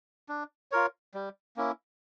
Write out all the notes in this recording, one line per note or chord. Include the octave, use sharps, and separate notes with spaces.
D4
F4 A#4 C#5
G3
A#3 C#4 E4